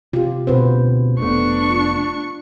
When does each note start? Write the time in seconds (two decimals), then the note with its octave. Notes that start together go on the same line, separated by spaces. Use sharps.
0.13 C3 F4 G4
0.47 D2 B2 C4 B4 C5
1.20 F1 A3 B3 D4 C#6
1.70 F4